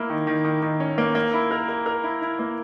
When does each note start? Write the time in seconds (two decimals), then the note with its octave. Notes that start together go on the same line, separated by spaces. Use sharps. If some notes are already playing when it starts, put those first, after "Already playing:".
Already playing: A#3 E4
0.10 D#3
0.27 D#3
0.45 D#3
0.63 D#3
0.80 C#4
0.98 A#3
1.15 A#3
1.33 E4
1.51 A#4
1.69 A#4
1.86 A#4
2.04 E4
2.22 E4
2.39 A#3